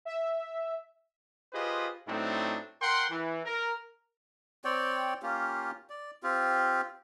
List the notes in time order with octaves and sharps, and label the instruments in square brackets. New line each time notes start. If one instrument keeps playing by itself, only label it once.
[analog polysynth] E5
[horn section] F4 G4 G#4 B4 C5 D#5
A2 F#3 A3 C4 D4 D#4
A#4 F#5 G5 C6
E3
A#4
[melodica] C4 C#5 D5 G5
A#3 C#4 F4 G4
D5
C4 F4 G4